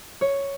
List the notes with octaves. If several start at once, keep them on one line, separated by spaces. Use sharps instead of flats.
C#5